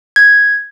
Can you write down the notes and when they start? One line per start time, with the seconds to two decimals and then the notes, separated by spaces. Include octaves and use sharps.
0.16 G#6